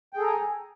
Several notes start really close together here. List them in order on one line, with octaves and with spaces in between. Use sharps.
G5 G#4 A4 A#5 G#5